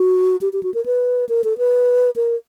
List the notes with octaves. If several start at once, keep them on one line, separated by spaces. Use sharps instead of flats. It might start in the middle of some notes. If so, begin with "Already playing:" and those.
Already playing: F#4
G4
G4
F#4
A#4
B4
A#4
A4
B4
A#4